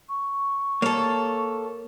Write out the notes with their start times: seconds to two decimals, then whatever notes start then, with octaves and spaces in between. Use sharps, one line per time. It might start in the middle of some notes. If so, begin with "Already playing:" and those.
0.09 C#6
0.82 A#3 A4 C#5